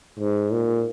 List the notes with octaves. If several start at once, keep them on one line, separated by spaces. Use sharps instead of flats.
G#2
A#2